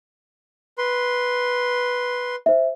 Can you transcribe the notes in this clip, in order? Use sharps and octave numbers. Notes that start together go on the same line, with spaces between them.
B4 C6
C5 E5